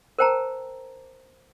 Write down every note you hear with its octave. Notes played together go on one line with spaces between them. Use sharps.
A#4 C5 G5 A5 A#5